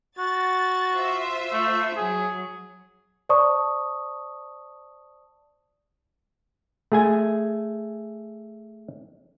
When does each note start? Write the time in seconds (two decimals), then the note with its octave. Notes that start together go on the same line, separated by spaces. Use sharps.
0.18 F#4 A6
0.93 F4 C5 E5
1.53 A3
1.97 F#3 G#4
3.29 C5 D5 A5 C#6 D#6
6.92 A3 G#4 G#5